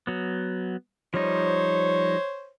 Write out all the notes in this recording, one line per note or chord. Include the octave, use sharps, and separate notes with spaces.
F#3 B3
F3 G3 D#4 C5 C#5